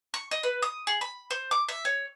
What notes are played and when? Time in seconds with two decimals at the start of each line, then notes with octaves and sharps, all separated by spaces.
0.14 C#6
0.31 D#5
0.43 B4
0.62 D#6
0.87 G#4
1.01 B5
1.31 C5
1.51 D6
1.69 E5
1.85 C#5